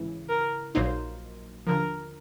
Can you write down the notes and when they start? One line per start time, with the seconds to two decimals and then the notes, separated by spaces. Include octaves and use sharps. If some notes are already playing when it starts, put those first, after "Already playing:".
Already playing: G#1 C#3 E3
0.29 A#4
0.75 A#1 A#2 F#3 A#3 D#4 C5
1.67 D#2 D3 F3 A#4